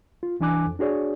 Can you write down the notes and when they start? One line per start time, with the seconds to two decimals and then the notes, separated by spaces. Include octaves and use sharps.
0.23 F4
0.40 C2 E3 D4 G#5 D6 F#6
0.66 F2
0.79 D4 F#4 G#4 C#5 D5